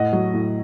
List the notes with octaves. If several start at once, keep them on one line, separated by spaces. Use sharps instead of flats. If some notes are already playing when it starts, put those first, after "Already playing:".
Already playing: A2 D#5 F#5
F#3
A2